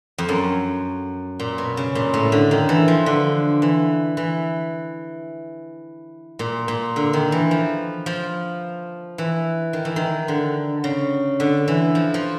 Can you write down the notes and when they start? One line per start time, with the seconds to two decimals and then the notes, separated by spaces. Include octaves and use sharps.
0.18 F2
0.29 F#2
1.40 A#2
1.58 B2
1.77 C#3
1.95 A#2
2.14 A2
2.32 D3
2.51 D#3
2.69 E3
2.88 F3
3.06 D3
3.62 E3
4.17 E3
6.39 A#2
6.68 A#2
6.96 D3
7.13 D#3
7.32 E3
7.51 F3
8.06 F3
9.18 E3
9.73 D#3
9.85 E3
9.96 D#3
10.28 D3
10.84 C#3
11.40 D3
11.68 E3
11.95 F3
12.14 F3